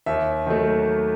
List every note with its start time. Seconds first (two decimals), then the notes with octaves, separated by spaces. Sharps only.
0.06 D#2 E5
0.46 D#3 F#3 A3